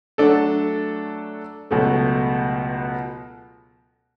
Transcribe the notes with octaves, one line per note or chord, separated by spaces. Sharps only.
F#3 A3 D4 A4
C#2 B2 F#3 A3